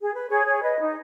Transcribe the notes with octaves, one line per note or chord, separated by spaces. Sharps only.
G#4
B4
G#4 C#5
G#4 C#5
B4 D#5
D#4